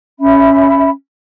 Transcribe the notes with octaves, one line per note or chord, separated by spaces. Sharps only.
C#4 E5 B5